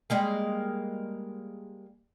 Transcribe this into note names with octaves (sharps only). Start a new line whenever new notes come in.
G3 G#3 A#3